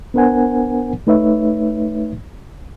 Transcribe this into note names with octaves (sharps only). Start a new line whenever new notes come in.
B3 D4 A#4 C5 F#5 G#5
A3 D#4 B4 C#5 E5